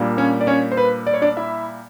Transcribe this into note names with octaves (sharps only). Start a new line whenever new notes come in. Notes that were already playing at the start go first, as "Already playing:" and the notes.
Already playing: A#2 G3 A#3 D4
C#4 C#5
D5
C#4 C#5
C5
B4
D5
C#5
D4 D5
E4 E5